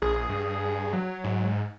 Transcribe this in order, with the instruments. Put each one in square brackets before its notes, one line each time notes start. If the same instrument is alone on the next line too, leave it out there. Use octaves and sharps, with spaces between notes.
[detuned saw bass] A#1 [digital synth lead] G#4
[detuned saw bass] G2
[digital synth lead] F#3
[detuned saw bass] G#2